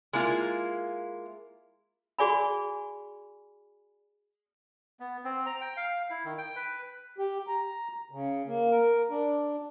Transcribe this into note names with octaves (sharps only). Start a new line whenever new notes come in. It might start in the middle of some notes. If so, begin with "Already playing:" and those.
G#3 A#3 E4 F4
F#4 G#4 D5 G#5 B5
B3
C4
A#5
G5
F5
E4
D#3
G5
B4
G4
A#5
C#3
A#3
A#4
D4